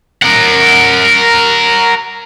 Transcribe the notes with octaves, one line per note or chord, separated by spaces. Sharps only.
A#4 F#5